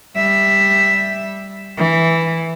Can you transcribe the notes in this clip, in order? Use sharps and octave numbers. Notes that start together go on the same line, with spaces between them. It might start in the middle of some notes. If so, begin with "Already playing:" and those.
G3 E5
E3